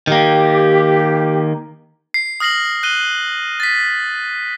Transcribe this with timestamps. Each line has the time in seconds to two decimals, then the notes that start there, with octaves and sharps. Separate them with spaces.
0.07 D#3 A#3 G4
2.14 C7
2.40 D#6 F6 A#6 C7 F#7
2.83 F#6 D#7 G7
3.60 A6 B6